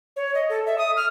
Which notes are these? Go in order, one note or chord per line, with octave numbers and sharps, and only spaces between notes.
C#5
D#5
A4
E5
D#6
F6